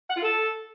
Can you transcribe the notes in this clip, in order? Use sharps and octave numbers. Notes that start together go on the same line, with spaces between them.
F#5
F4
A4